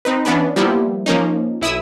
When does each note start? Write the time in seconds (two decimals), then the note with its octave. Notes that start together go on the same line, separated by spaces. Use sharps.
0.05 C4 D#4 B4
0.25 E3 B3 C#4 D4 B4
0.56 F3 G3 A#3 B3 E4
1.06 F3 A#3 C#4 D#4
1.61 B1 E4 D#6 E6